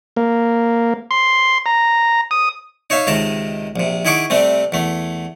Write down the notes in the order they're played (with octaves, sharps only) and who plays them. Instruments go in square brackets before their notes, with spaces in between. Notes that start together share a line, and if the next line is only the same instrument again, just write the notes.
[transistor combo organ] A#3
C6
A#5
D#6
[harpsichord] D#4 C#5 E5 F5
C#2 C3 D#3 A5 A#5
A#1 C3
D#3 E4 G#4 F#5 C#6 D6
C3 G3 A3 C4
E2 A3